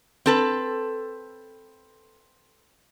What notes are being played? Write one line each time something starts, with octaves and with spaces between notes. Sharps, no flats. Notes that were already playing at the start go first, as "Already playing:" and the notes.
C4 A4 B4